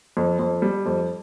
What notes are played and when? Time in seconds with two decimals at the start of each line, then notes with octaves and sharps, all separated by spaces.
0.17 F2
0.39 F2
0.62 G3
0.86 F2